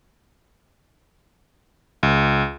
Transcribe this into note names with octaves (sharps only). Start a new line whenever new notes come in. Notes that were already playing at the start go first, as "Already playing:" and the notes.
C#2